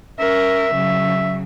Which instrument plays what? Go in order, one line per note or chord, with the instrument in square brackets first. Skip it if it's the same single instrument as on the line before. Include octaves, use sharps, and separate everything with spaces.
[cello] C#4 A#4 [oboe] E5
[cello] C#3 F#3